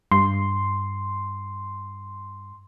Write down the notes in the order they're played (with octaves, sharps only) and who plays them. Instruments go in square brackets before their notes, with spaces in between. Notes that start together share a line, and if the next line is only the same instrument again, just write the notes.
[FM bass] G2 [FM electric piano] C6